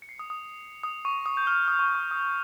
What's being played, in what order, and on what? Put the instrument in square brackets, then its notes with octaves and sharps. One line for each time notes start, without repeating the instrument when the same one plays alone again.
[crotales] C#7
C7
D#6
D#6
D#6
C#6
D#6
G6
F6
D#6
C#6
D#6
C#6
D#6
D#6